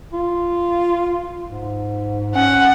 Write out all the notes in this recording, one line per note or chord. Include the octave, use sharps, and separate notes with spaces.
F4
G#2
C#4 F#5